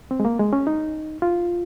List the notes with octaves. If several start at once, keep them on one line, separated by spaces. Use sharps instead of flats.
C4
G#3
A#3
G#3
C#4
D#4
F4